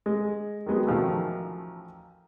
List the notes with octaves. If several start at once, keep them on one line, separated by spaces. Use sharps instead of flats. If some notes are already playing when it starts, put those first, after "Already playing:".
G#3
D#3 F#3 G#3 B3
A1 D#3 F3 F#3 A3